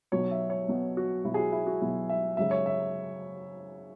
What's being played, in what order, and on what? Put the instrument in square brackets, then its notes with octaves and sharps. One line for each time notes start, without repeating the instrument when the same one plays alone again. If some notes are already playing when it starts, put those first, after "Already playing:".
[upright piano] B1 B2 F#3 C#5
E5
C#5
B1 B2 F#3
F#4
B1 B2 F#3 E4
G#4
F#4
E4
F#4
B1 B2 F#3 E4
E5
G#1 F#2 C#3 E5
C#5
E5